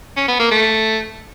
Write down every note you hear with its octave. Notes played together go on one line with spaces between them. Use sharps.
C#4
B3
A#3
A3